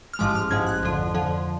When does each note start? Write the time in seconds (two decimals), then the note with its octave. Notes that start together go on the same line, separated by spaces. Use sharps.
0.14 F6
0.19 A1 G#2 F3 G#3 D6
0.35 F6
0.51 A1 G#2 F3 G#3 G#6
0.67 F#6
0.83 F2 D3 F3
1.14 F2 D3 F3